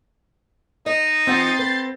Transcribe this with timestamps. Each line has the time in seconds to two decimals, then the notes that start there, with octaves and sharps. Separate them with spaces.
0.86 D#4 D#5
1.27 E3 C4 F4 F#5 G6 A6 C7
1.59 B4